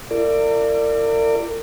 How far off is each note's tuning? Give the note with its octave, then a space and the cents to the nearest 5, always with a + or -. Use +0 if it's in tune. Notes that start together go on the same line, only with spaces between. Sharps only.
E4 +40 A#4 -40 D5 +5